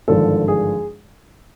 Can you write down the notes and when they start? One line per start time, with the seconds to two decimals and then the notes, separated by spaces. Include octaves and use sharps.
0.08 G#1 G2 D3 F3 G#3 A4
0.48 G#4